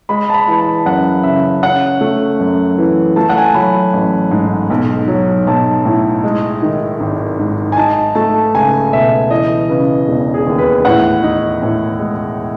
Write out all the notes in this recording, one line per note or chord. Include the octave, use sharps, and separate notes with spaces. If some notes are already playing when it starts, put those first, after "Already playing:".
G#3 B5
A5
B5
E3
A5
F#2 F#5
C#3 E5
C#4 F#5
A3
F#2
E3
A3 A5
F#5
G#5
A5
F#3 B5
A1
G#2
B1
F#3
B1 A5
A2
G#3
D#3
G#1
G#2
G#5
D#4 A5
A3 A5
C#2 G#5
B2 E5
E3 D#5
C#3 B4
E1
G#4
D#2
B4
A2 F#5
D#4
A2
G#3